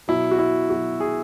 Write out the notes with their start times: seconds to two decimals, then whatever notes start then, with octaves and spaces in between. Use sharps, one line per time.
0.08 B2 F#3 E4
0.31 F#4
0.39 E4
0.70 B2 F#3 F#4
1.00 G#4